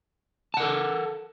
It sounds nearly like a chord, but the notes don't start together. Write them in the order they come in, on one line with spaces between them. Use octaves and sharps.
A5 F#5 A#4 A4